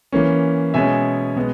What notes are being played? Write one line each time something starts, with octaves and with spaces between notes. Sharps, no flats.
E3 A#3 C#4
B2 G#3 C#4 E5 G#5
B2 G#3 B3